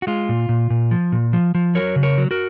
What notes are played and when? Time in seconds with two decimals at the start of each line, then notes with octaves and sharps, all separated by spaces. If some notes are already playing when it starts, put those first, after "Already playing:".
0.02 F#4
0.07 G#3 F4
0.29 A#2
0.49 A#2
0.70 A#2
0.91 F3
1.12 A#2
1.33 F3
1.55 F3
1.75 F#3 A#4 C#5
1.96 C#3
2.03 A#4 C#5
2.18 F#3
2.31 F#4 A#4